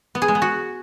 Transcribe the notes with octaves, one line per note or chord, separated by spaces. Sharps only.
B3
G#4
G#3
B3
F#4